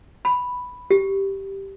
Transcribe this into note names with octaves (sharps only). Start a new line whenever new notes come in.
B5
G4